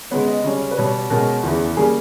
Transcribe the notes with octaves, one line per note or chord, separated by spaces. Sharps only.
C#3 G#3 B3 C#5
D#5
C#3 G3 C#4
B4
B2 G3 B3 C#5
B2 G#3 C#4 A#4
E2 C#3 E3
C#3 G3 A#3 G#4